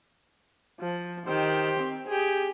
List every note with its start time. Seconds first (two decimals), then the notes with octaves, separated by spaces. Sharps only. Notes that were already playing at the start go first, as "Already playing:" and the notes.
0.80 F3
1.26 D#3 G4 C5
1.80 C4
2.08 G4 G#4